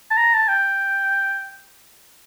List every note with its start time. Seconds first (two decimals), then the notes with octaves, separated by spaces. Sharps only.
0.11 A5
0.17 A#5
0.34 A5
0.48 G5